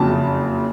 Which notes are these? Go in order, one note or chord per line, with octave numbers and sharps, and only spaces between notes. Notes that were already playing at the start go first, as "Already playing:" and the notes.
Already playing: F#1 F2 C#3 F#3 A5